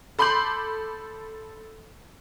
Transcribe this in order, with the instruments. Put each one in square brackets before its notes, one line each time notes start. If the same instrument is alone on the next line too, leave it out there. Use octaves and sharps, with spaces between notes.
[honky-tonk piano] A4 B5 C6 D6 G6 F#7